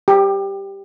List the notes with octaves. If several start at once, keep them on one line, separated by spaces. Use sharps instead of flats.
G4